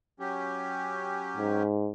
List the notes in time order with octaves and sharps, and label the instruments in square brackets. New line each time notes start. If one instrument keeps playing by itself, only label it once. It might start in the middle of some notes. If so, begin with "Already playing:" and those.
[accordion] F#3 C#4 G4
[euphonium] G#2